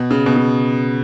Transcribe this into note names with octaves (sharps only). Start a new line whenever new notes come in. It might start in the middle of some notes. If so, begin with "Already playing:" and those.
Already playing: B2
C#3
B2
C#3